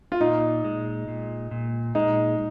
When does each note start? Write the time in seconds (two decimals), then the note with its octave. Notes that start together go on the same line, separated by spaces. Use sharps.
0.12 F4
0.21 A#2 D#4
0.64 G#3
1.08 A#2
1.51 A#2
1.95 G#3 D#4